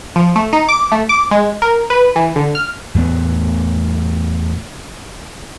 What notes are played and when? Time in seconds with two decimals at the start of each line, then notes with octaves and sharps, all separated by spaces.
0.16 F3
0.36 A3
0.53 D#4
0.69 D6
0.92 A3
1.09 D6
1.31 G#3
1.62 A#4
1.90 B4
2.16 E3
2.36 D3
2.55 F6
2.95 E2 A2 A3 B3